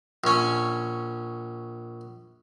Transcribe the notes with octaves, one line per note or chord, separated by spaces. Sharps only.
A#1 C#4